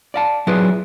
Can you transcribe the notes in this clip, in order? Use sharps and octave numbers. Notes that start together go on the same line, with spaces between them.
D5 F5 A5
F#3 E4 F4 G#4 B4 D5